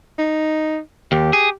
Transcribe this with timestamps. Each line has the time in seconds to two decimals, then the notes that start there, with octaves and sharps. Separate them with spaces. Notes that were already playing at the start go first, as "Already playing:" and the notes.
0.18 D#4
1.12 D#2 G4
1.33 G#4